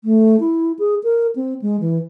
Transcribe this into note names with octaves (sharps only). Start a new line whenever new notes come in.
A3
E4
G#4
A#4
C4
G#3
E3